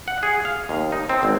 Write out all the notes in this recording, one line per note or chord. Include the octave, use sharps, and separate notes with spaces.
F#5
G#4
F5
D#2
D#4
C4
G#1